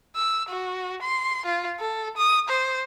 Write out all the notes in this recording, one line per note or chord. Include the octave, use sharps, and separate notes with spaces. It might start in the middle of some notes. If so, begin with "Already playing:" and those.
E6
F#4
C6
F4
A4
D#6
C5